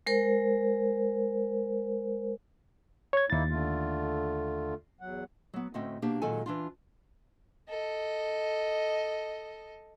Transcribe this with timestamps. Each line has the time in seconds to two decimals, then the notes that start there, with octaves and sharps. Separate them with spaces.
0.07 G#3 A#4 C5
3.13 C#5 G#6
3.30 D#2 A#3 D#4 E4 A6
3.50 D3 A3 F4
5.01 E2 F#3 F#5
5.54 F#3 B3
5.74 D2 A2 C4 C#4 D#5 G5
6.02 B2 A#3 D4 G4 F5
6.22 A#2 D#3 F#3 G#3 A4 G#5
6.46 E3 D4 F4
7.69 A4 D#5